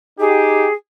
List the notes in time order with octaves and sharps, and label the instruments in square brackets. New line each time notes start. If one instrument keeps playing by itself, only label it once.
[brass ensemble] D#4 G4 [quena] G#4